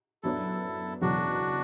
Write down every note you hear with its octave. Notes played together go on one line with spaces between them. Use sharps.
F#2 F#3 B3 D4 E4 A4
F#1 E2 B2 F#3 D4 F#4